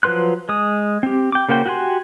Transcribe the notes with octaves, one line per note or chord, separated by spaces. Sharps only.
F3 F#3 B4 C6 F#6
G#3 D#6
C4 G4
G5 D6
C#3 A#3 F#4 C5 G5
F#4 G4 F#5 G#5 C6